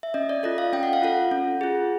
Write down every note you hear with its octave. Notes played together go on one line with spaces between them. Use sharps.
E5
C#4 D#5
D5
F4 A4 D#5
F5
C#4 G5
F#5
F5
F4 A4 F#5
C#4
F4 G#4